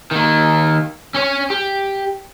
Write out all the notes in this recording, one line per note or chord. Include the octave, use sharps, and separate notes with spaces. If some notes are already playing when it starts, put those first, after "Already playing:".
D#3 A#3
C#4 C#5
G4